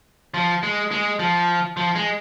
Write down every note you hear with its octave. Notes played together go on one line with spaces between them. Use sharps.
F3
G#3
G#3
F3
F3
G#3